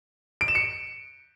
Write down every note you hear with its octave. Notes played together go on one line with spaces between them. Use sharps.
D7
E7
C#7